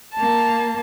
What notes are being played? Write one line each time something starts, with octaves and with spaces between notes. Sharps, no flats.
A#3 A5